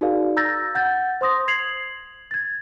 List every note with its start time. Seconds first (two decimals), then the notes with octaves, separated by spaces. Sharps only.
0.01 D#4 F#4 G#4 A#4 D5 F5
0.37 A#5 E6 G6 A6 A#6
0.75 F#5 G6 A6
1.21 C5 C6 D#6 A#6
1.48 G#6 C7 F7 F#7
2.31 G#6 A6